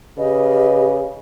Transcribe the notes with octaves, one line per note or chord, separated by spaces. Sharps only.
C#3 G4 B4 D#5